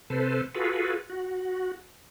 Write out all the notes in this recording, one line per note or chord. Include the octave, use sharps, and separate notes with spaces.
C3 A4 B4 C5
F4 F#4 G#4 A4 B4
F#4